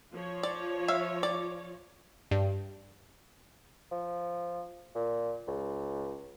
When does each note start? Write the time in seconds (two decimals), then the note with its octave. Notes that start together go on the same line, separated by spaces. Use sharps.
0.12 F3 C#5
0.43 D5
0.88 E5 F5
1.23 D5
2.31 G2
3.92 F3
4.95 A#2
5.47 C#2